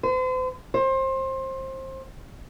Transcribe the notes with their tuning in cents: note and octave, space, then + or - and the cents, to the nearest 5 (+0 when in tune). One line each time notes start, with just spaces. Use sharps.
C5 -40
C5 +25